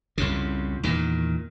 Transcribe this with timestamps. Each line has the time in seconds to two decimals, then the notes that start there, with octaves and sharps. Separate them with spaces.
0.18 C2 F2 C#3
0.83 E2 A#2 D#3